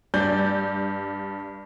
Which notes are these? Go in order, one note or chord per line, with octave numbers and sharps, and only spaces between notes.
G2 D5 G6